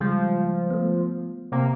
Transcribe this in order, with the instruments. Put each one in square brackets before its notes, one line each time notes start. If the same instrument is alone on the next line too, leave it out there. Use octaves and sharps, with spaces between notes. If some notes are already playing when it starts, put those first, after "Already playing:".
[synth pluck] C#3 G3 G#3 [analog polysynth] F3
[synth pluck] A3 B3
[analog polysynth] C3 A#3